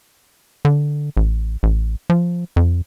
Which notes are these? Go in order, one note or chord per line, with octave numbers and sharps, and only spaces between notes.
D3
A1
A1
F3
F2